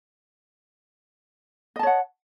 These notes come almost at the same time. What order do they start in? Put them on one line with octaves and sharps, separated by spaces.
D#5 A5 C#5 F#5